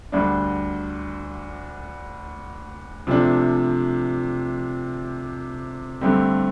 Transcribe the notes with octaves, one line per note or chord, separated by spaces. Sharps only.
D2 D3 G3 D4
C3 F3 A3 D4
G2 D3 A3 C4 G4